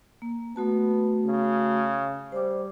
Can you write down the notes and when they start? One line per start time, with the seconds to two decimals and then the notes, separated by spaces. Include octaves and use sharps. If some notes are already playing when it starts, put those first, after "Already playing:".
0.22 A#3
0.56 A3 B3 F#4 A5
1.26 C#3
2.32 G3 C5 D6